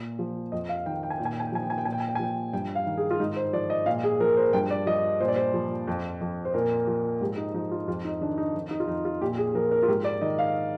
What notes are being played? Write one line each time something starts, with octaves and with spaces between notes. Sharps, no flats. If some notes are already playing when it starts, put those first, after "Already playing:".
Already playing: A#2
F3
F2 D#5
F5
D#3 G5
G5
G#5
A#2 G5
G#5
G5
G#5
G5
F3 G#5
G5
G#5
G5
A#2 G#5
G5
G#5
G5
G#5
F3 G5
G2 G5
F5
D#3
G#4
F4
G#2 D#4
C5
F3 D5
D#5
A#2 F5
G#4
F3 A#4
C5
G2 G5
D5
F3 D#5
A#2 C5
D5
C5
F3
F2
F2
C5
A#2 A#4
F3
G#2 G4
D#4
F3 D#4
F4
F2 F4
D#4
D#3 D4
D#4
F2
D#4
F4
F2 D#4
F4
A#2 G4
G#4
F3 A#4
A#4
F4
G#2 G4
D5
D#3 D#5
F5